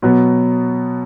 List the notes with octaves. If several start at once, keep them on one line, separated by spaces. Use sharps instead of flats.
B2 F#3 B3